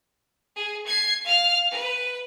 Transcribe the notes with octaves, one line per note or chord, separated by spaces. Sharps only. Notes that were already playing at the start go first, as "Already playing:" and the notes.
G#4
G#6 C7
F5 F6
B4